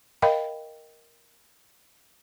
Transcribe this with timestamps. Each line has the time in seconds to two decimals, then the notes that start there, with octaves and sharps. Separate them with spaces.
0.22 A#4 D#5 F5 G5 B5